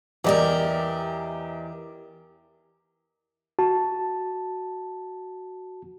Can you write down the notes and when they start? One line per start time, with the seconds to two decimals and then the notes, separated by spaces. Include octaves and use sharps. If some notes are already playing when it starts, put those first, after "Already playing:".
0.24 E2 E3 G4 A#4 D5 D#5
3.59 F#4 A5